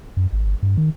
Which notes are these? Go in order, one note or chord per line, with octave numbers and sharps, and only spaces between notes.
F#2
G#1
G1
G2
D#3